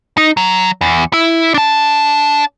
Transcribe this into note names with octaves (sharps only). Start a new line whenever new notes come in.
D#4
F#3
E2
E4
D4 A5